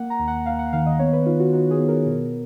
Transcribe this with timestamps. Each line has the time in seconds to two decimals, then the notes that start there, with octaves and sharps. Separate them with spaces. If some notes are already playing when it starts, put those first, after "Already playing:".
Already playing: A#3 F#5
0.10 A#5
0.19 D#2
0.28 F#5
0.46 D#2 F5
0.59 F#5
0.73 D#3 F5
0.86 D#5
0.99 B3 C#5
1.13 B4
1.26 D#4 F4
1.39 F#4
1.53 D#4 F#4
1.71 G#4
1.79 B3
1.88 A#4
2.06 B2